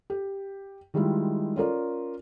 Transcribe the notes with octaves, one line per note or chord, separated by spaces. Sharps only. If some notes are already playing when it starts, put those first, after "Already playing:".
G4
D#3 G3 G#3 E4 F4
C#4 F4 A#4 D5